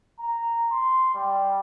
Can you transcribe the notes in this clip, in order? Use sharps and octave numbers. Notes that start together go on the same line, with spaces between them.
A#5
C6
G3